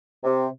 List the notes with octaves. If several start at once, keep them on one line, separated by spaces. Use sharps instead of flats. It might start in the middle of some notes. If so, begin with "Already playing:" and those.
C3